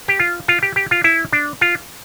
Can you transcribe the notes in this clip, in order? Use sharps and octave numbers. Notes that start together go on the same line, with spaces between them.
G4
F4
F4
G4
G4
F4
E4
D4
F4